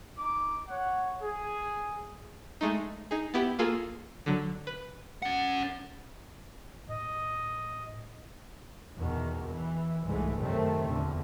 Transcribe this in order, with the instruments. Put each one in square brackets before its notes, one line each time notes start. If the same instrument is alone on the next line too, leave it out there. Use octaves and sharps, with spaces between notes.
[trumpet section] D#4 D6
C#5 F#5
G#4
[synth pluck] G#3 A3 D#4
D#4 G#4
B3 E4 G4
A#3 F4 G#4 A4
D3 F#3
B4
[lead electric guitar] C#4 F#5
[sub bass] A2 [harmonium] D#5
[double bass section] E2 B2 D#3
E3
G1 C2 G#2 E3 G#3 A3
F#2 A2 C3 D#3 A3 C4
E2 A#2 D3